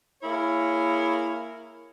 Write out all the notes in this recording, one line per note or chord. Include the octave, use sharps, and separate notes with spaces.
A#3 E4 G#4 A#4 C#5